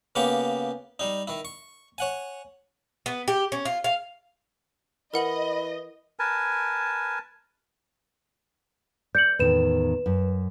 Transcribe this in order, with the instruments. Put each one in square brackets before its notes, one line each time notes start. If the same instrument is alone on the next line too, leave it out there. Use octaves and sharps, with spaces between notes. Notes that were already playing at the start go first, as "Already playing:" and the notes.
[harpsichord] C#3 A#3 B3 G4 C#6
G3 D#4
D#3 E4
C#6
C#5 F#5 G#5
[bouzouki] B3
G4
C#4
F4
F5
[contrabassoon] E3 [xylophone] A#4 F#5 F#7 [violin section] D#5 [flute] B5
[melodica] A#4 B4 G#5 A5
[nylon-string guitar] D5 [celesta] G6 C#7 F#7
[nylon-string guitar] E2 A2 D#3 [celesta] B4 E7
[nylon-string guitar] F#2